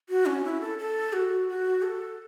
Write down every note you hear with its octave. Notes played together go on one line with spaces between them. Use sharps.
F#4
C#4
E4
A4
A4
F#4
F#4
A4